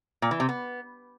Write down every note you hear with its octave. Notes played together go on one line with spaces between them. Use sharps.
A#2
E3
C3
B3